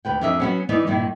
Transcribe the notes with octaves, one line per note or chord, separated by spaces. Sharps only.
D2 B4 G5
F2 D4 A#4 D#5 E5
F#3 B3 C#4
E3 B3 D#4 D5 D#5
G2 A#2 D#3 E4